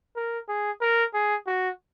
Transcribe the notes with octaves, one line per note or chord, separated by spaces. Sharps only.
A#4
G#4
A#4
G#4
F#4